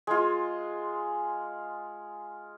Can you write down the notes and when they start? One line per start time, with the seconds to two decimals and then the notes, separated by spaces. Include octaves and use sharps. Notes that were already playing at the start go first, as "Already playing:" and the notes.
0.07 G#3 F4